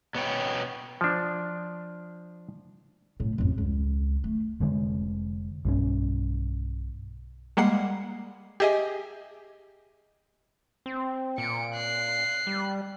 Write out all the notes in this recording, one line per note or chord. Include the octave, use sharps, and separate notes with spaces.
B2 B3 C#4 C#5 G5
F3 D4
A2 A3
A1 F2
C#2
A3
F1 D3 G#3
B1 G2 F#3 C#4
G3 G#3 A#3 F#5 C7
G4 G#4 D#5 E5 G#5
C4
A#2 C#7 D7
F#6 C7
G3